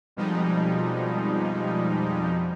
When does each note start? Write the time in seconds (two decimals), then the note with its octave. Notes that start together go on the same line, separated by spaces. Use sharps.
0.17 F2 B2 F3 G3 G#3 D#4